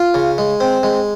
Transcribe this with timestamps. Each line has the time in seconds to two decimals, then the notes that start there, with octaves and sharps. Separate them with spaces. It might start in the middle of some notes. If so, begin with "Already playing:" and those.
Already playing: F4
0.14 C#3
0.38 G#3
0.60 C4
0.83 G#3